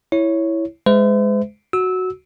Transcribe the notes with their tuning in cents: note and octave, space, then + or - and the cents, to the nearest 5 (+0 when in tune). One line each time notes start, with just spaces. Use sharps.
E4 +0 C#5 +0
G#3 +0 C5 -45 E5 +0
F#4 +0 E6 -20